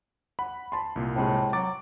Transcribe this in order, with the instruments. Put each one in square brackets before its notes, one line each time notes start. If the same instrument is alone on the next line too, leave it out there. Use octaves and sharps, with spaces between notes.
[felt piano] F#5 [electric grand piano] B5
[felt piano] A5 C6
[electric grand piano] C2 A#2
[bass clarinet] A2 [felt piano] C3 G#3
[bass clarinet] F#3 [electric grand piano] D6 [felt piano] A6